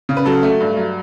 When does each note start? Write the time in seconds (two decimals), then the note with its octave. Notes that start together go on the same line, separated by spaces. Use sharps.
0.09 C#3
0.17 B4
0.26 F#3 F#4 A4
0.43 A3
0.61 G2
0.77 F#3